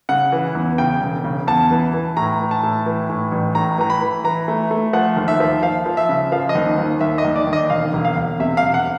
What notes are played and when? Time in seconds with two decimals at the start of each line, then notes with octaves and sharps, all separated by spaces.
0.09 C#3 F#5
0.32 E3
0.55 E2
0.78 C#3 G5
1.02 E1
1.24 C#3
1.47 E2 A5
1.71 E3
1.93 E3
2.17 A2 A#5
2.40 E3
2.51 A5
2.63 A2
2.86 E3
3.09 A2
3.32 A1
3.55 A2 A#5
3.78 E3 A#5
3.90 B5
4.01 E3
4.24 E3 A#5
4.48 A3
4.71 A3
4.93 F3 F#5
5.17 D#2
5.28 E5
5.40 F3
5.63 F3 F5
5.86 F3
5.97 E5
6.09 C#3
6.32 F3 F5
6.49 D#5
6.55 D#2
6.78 D#2
7.01 D#2 E5
7.18 D#5
7.24 D#2
7.36 D5
7.47 D#2
7.53 D#5
7.70 E1 F5
7.93 E1
8.05 F5
8.16 E1
8.40 C3 E5
8.57 F5
8.63 E1
8.74 F#5